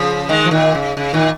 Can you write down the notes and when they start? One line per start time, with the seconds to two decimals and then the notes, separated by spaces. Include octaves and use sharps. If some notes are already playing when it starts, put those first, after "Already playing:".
Already playing: C#3 F3
0.29 D#3 G#3
0.45 F3
0.51 A#2 D#3
0.75 C#3
0.97 C#3
1.13 A#2 D#3